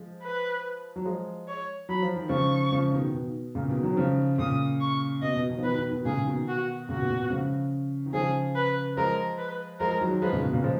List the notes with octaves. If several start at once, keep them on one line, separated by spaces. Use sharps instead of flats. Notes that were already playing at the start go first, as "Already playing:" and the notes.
Already playing: F3 G#3
B4
F#3
F3 G#3
C#5
F#3 B5
F3
D#3
C#3 F3 C#6
C#3 F3
B2 D#3
B2
A#2 C#3
B2 D#3
D#3 F#3
C#3 F3
A#2 C#3 D#6
C#6
B2 D#5
B2
B2 D#3
F3
B2 D#3 B4
B2 D#3
B2 D#3
A#2 C#3 G#4
B2 D#3
F#4
A#2 C#3 F#4
B2
A#2
B2
C#3 F3
D#3
C#3 F3 G#4
B4
F3 G#3 A#4
B4
F3 G#3 A#4
D#3 F#3
F3 G#3 B4
A#2 C#3
B2
A#2 C#3
F3 G#3